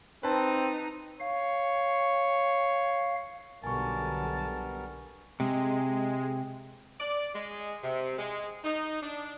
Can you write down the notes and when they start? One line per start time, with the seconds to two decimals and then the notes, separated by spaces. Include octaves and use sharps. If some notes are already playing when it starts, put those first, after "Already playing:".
0.23 C4 D#4 B4 A5
1.20 C#5 F5
3.64 B1 D3 G3 B3 A#4 G#5 A5 C#6
5.40 C3 G#3
7.00 D5
7.35 G#3
7.83 C3
8.19 G#3
8.64 D#4
9.03 D4